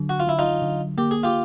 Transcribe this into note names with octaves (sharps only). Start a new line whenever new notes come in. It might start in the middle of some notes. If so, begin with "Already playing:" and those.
Already playing: D3 F#3
F#4
F4
D3 E4
D#4 F4
D3
A#3 G4
G#4
F4 G4